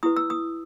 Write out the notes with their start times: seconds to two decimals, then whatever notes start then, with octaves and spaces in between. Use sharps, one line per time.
0.03 E4 G4 B4 D#6
0.17 E6
0.30 D#6